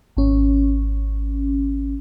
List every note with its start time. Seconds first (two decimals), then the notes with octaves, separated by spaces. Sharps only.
0.17 G#1 C#4